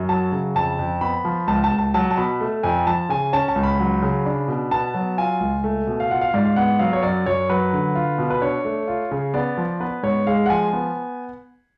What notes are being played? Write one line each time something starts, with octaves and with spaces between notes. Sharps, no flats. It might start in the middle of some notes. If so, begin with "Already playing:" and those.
Already playing: F#2
F#3 A5
C#3
F2 A5
F2
B3 B5
F3
C#2 A5
A5
C#2
A5
F#3 A5
A5
B2 B5
A3
F2 G#5
F3 A5
C#3 G#5
C#4 A5
A5
C#2
B5
F#3
C#3
D4
B2
B3 A5
F#3
F4 G#5
C#2
A3
B2
F5
F4 F#5
F5
G#2 D5
F5
B3 F#5
F#3 F5
C#5
F#2 D5
F#2 C#5
F#3 B4
D3
F4
B2
B4
D4 C#5
A3
F4
C#3
B3 D5
F3
B3 B4
G#2 C#5
G#3 F5
F#5
F3 G#5
B3